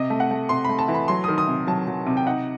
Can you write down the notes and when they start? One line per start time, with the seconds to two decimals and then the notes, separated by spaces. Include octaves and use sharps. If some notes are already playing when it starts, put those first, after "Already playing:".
Already playing: C3 D#5
0.10 A3
0.20 F#5
0.31 A3
0.49 C3 C6
0.65 A3 B5
0.79 A5
0.88 E3
0.94 B5
1.08 F#3 C6
1.24 D#3 D#6
1.38 D#6
1.47 C3
1.67 F#3 A5
1.88 F#3
2.06 C3
2.17 G5
2.26 D#4 F#5